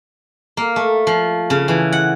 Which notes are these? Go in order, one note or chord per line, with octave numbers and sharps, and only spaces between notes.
A#3
A3
F3
C#3
E3
F#5